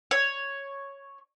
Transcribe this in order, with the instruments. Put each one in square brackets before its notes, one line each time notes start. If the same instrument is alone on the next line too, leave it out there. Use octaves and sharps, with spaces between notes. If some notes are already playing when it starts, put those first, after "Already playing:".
[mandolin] C#5